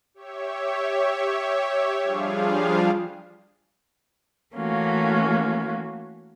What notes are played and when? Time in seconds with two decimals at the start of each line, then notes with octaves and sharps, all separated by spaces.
0.14 G4 C#5 E5
2.02 F3 G3 D4 F4 G#4 F5
4.54 E3 A3 A#3 C#4 F4 F#4